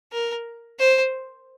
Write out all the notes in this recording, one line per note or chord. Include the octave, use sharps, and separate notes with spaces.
A#4
C5